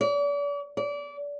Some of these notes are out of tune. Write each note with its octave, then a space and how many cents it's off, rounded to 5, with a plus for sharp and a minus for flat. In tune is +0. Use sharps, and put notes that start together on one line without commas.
D5 -40
D5 -30